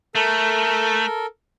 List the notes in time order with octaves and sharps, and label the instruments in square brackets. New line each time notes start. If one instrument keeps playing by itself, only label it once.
[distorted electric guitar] A3 [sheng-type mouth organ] A4 A#4